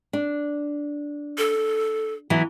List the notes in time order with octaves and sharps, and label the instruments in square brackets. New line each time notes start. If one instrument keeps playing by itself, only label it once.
[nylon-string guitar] D4
[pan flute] A4
[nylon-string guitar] E3 F#3 B3